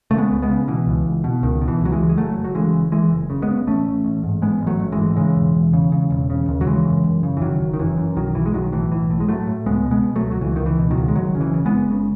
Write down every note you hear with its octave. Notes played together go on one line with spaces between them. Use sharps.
C#3 A3
G#3 B3
C#2
G#3 B3
C#3
B2 E3
C#2
C#2
B2
C#2 D#3
B2
E3
C#2
F#3
E3 G#3
C#2
G#3
F#1 F#3 A3
F#1
F#3
C#3 E3 G#3
F#1
F#1 E3 G#3
F#1
C#3
G#3 B3
C#3
A1 A3 C#4
A1
A1
G#2
A1 G#3 B3
A1
F#3 A3
A1
E3 G#3
G#2
C#3 E3 G#3
E1
E1
C#3
C#3
E1
C#3
D#2
F#3
C#3 E3 G#3
F#2
F#2
C#3
E3
F#1 D#3 F#3
F#1
D#3
F#2 E3
F#2
B1 D#3 F#3
B1 E3
G#3
B1 D#3 F#3
A2 E3
B1 E3
A2
G#3
A2 F#3 A3
A2
C#2 G#3 B3
B2
G#3 B3
B2
F#3 A3
C#2
F#3
C#2 E3
C#2 D#3
E3
B2
D#3 F#3
C#2
G#3
F#1 D#3 F#3
C#3
E3
C#3
G#3 B3
F#1
C#3